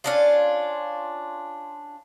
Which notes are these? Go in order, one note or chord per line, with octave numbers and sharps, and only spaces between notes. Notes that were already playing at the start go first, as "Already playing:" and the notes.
C#4 D4 F4